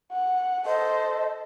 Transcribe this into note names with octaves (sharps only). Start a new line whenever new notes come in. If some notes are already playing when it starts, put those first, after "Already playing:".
F#5
A4 C5 D#5